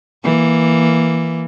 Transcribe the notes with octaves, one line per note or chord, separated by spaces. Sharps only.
E3 A#3